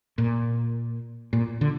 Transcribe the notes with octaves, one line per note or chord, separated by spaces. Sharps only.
A#2
A#2
D3